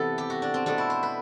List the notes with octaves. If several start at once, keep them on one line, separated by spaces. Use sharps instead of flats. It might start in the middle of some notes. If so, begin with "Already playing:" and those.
Already playing: C3 E3 B3 A4 B4
G4
F#4
D4
C4
B2 A3 C4 D4
E4
C5
B4